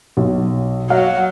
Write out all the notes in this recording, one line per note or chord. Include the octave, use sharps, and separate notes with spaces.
B1
F#3 F5